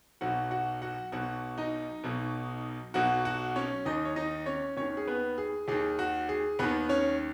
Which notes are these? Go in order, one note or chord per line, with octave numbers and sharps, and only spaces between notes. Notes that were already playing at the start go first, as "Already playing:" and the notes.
B1 B2 F#4 F#5
F#4 F#5
F#4 F#5
B1 B2 F#4 F#5
D#4 D#5
B1 B2
B1 B2 F#4 F#5
F#4 F#5
C#4 C#5
D#2 D#3 D#4 D#5
C#5
D#4 D#5
C#4 C#5
D#2 D#3 C#4 C#5
G#4
B3 B4
G#4
D#2 D#3 G#4
F#4
G#4
D#2 D#3 B3 B4
C#4 C#5